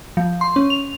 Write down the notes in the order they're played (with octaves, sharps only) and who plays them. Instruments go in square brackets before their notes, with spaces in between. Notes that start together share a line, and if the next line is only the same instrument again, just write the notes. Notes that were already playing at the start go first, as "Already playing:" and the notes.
[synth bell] F3
C6
C#4
F7